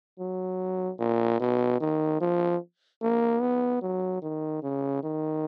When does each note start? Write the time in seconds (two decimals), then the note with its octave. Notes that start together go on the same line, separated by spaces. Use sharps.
0.19 F#3
0.99 A#2
1.40 B2
1.80 D#3
2.20 F3
3.02 A#3
3.41 B3
3.81 F#3
4.22 D#3
4.62 C#3
5.03 D#3